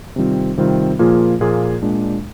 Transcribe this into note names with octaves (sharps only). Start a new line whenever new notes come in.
C3 D#3 G3 C4 F4
C3 D#3 G3 C4 F4
A#2 F3 A#3 F4 G#4
A#2 F3 A#3 F4 G#4
A#2 G#3 D4